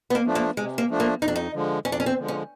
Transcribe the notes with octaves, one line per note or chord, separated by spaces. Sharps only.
B3
A#3
F3 A3 D4
A#3
C3 G#3
A#3
F3 A3 D4
A#3
F2 D#4
D4
D#4
D3 F3 G#3
F2 C#4
D4
C#4
C4
D3 F3 G#3
C#4